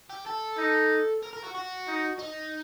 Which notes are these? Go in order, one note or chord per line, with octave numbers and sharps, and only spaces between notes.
G4
A4
D#4
A#4
A#4
F#4
F#4
D#4
D#4